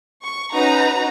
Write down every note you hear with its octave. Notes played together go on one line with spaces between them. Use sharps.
C#6
C#4 D#4 F#4 B4 A#5